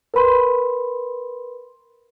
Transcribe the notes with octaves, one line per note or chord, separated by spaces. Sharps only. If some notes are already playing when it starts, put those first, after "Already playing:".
A#4 B4 B5 C6